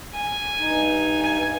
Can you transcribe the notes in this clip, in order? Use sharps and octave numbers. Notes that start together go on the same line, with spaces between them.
G#5
G2 D#4
G#5